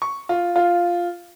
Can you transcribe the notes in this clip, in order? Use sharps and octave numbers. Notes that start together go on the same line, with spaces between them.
C#6
F4
F4